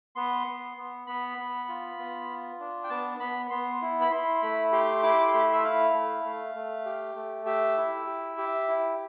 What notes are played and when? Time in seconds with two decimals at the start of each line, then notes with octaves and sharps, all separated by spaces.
0.16 B3 C6
0.47 B3
0.77 B3
1.07 B3 B5
1.38 B3
1.69 F4
1.99 B3
2.30 F4
2.60 D4
2.84 G5
2.89 B3 A5
3.20 B3 B5
3.50 B3 C6
3.82 E4
4.01 B5
4.11 E4 C6
4.42 A3 B5
4.72 G4 C6
5.03 E4 D6
5.10 C6
5.18 D6
5.33 A3 C6
5.53 E5
5.63 E4 F5
5.94 A3
6.24 A3
6.55 A3
6.86 G4
7.15 A3
7.46 G4 E5
7.77 E4
8.06 G4
8.37 G4
8.68 E4